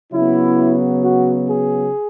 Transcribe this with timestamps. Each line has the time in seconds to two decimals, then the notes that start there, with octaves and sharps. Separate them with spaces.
0.12 C#3 F#3 B3 E4
1.02 F#4
1.48 G#4